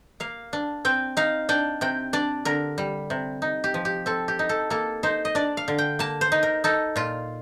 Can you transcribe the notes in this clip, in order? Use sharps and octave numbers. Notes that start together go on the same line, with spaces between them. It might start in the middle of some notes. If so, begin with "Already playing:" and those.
A#3 F5
D4
C4 G5
D#4 F5
D4 G5
C3 G5
D4 D5
D3 A#4
G3
C3
D#4
G4
F3
G4
C4 A4
G4
D#4
A4
A#3 A4
D#4 C5
D#5
D4 D5
F5
D3
G5
A#3 A5
C5
D#4
A#4
D#4 A4
A#2 F4